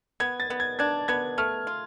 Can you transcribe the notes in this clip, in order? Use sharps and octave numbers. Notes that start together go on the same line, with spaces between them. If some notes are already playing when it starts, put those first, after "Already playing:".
B3 G#6
A6
B3
G#6
D4 G#6
B3 G#6
A3 F6
F4